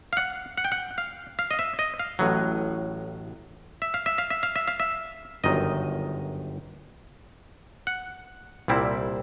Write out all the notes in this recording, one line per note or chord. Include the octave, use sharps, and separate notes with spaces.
F5
F#5
F#5
G5
F#5
F5
F5
D#5
E5
D#5
F5
A1 A2 F#3
E5
F5
E5
F5
E5
F5
E5
F5
E5
G1 F#2 D#3 D#5
F#5
C2 A#2 G3 C4 E4